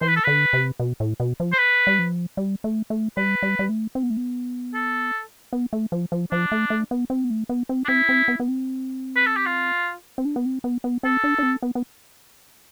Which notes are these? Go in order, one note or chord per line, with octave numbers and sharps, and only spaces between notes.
E3 C5
B4
A4
D3 B4
C3
B2
A2
B2
F3
C5
B4
G3
F3
G3
A3
A3
G3 B4
G3
G3
A3
C4
B3
A3
B3
A4
B3
A3
F3
F3
F3 D4
A3
A3
B3
C4
B3
A3
B3
C4
D4
C4 E4
C4
B3
B3
C4
B4
A4
G4
F4
C4
D4
B3
C4
B3
B3
C4 A4
D4
D4
C4
B3
B3